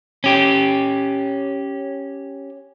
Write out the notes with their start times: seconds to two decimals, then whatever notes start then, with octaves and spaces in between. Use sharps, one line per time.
0.24 C#4 G4